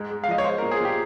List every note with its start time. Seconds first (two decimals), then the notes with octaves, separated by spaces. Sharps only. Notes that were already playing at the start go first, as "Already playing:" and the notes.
Already playing: G#2 G#3
0.10 G#3
0.24 F5
0.28 F3 D#5
0.38 C#5
0.44 G#3 C5
0.58 A#2 A#4
0.71 G#4
0.81 A#2 G4